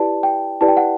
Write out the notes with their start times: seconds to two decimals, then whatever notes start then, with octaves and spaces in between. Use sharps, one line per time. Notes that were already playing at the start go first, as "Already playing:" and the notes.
Already playing: E4 G4 B4 D5 A5
0.23 G5
0.61 E4 G4 B4 D5 A5
0.68 G5
0.77 F#5